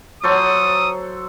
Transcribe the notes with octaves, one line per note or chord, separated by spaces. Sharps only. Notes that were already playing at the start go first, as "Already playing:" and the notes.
F#3 A4 C5 D#6